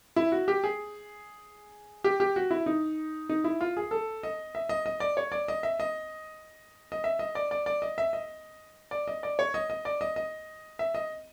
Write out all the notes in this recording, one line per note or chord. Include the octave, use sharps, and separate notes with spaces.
E4
F#4
G4
G#4
G4
G4
F#4
E4
D#4
D#4
E4
F4
G#4
A4
D#5
E5
D#5
D#5
D5
C#5
D5
D#5
E5
D#5
D#5
E5
D#5
D5
D5
D5
D#5
E5
D#5
D5
D#5
D5
C#5
D#5
D#5
D5
D#5
D#5
E5
D#5